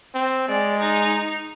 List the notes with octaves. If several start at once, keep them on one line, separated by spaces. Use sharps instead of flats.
C4
G#3 D5
D#4